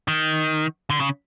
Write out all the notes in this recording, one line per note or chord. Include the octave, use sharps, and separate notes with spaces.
D#3
D3
C#3